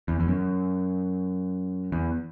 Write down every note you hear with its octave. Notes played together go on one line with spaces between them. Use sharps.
E2
E2
F#2
E2